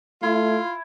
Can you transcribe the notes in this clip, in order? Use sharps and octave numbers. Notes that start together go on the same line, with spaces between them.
A3 E4 F4